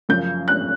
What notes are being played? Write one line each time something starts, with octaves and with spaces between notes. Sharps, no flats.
F#2 C#3 F3 G6
F#6